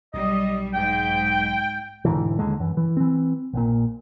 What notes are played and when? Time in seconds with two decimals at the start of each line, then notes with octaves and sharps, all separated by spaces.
0.14 B1 G3 D#5
0.74 G#2 G5
2.05 E1 G#2 D3 E3
2.39 D#2 G#2 D3 G#3
2.60 F#2 E3
2.77 E3
2.97 E3 C4
3.53 A#1 A#2